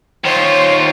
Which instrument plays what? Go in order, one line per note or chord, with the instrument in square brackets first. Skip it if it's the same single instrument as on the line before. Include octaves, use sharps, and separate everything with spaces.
[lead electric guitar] D#3 F4 [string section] C5 C#5